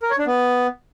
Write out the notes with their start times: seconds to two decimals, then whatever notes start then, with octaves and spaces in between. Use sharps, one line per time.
0.03 A#4
0.11 C#5
0.19 D4
0.27 B3